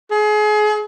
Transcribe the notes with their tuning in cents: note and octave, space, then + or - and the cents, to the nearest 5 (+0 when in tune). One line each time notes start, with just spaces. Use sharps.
G#4 +30